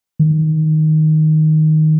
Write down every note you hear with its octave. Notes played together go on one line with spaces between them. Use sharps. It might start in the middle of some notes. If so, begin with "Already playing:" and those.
D#3